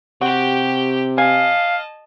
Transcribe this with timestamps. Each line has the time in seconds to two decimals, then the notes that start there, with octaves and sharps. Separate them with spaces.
0.21 C3 F#4 G4 G5
1.18 D#5 F5 G#5 A5